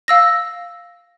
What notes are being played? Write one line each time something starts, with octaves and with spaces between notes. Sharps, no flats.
F5 E6 A#6